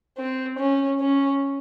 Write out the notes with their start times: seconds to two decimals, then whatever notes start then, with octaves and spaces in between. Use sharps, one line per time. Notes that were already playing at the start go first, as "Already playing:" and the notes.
0.18 C4
0.59 C#4
1.00 C#4